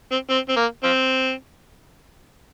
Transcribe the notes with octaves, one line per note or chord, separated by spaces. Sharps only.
C4
C4
C4
A#3
F3 C4